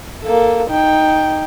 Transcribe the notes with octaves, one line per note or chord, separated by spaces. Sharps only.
A#3 A4
D#4 G5